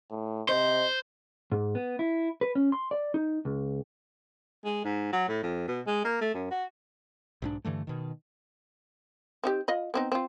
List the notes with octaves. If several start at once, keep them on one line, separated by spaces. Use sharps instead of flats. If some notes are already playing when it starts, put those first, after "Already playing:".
A2
C3 C5 D#5
G#2
B3
E4
B4
C#4
C6
D5
D#4
C#2
G#3
G#2
F#3
A2
F2
B2
G#3
A#3
A3
F#2
F#4
B1 G#2 D4
G2 D3 E3 A3
B2 D#3
C4 D#4 G4
F4 D#5 B5
B3 C4 D#4
C4 F4